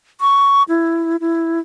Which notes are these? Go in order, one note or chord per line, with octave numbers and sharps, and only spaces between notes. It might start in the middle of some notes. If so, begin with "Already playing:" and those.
C#6
E4
E4